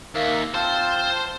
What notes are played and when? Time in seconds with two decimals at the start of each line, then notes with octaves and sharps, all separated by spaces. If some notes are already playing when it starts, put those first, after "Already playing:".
0.15 D#2 A#3 A#4 E5
0.54 C4 F4 C5 A5